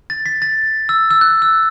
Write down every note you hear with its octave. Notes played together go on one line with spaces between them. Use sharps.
A6
B6
A6
E6
E6
F#6
E6